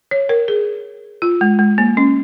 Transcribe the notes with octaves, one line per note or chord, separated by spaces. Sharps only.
C#5
A#4
G#4
F4
G#3
G#3
A#3
C#4